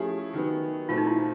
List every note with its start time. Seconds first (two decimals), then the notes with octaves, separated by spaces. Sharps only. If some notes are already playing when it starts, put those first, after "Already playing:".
Already playing: F3 A3 C#4 E4 G4 G#4
0.33 D#3 F#3 B3
0.89 A#2 F#3 A3 C4 F4
0.98 D#4
1.07 E4